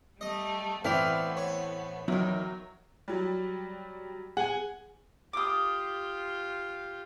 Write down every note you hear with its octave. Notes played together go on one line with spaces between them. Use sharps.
G3 A3 D#5
A2 E3 B3 C4 D5 F5 B6 F7
C#5
E2 D#3 F#3
F#3 G3
G#4 F#5 G#5
F4 G4 D6 D#6